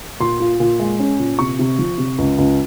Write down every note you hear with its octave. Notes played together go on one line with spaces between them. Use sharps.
A#2 C6
F4
A#2
G#3
C#4
A#2
C3 C#6
C3
F3
C3
C#2
C#2